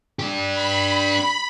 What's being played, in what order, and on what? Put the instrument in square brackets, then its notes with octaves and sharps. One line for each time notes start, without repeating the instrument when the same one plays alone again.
[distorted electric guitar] D4 G4
[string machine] B5